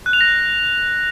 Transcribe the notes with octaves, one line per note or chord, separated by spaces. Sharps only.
F#6
F7
A#6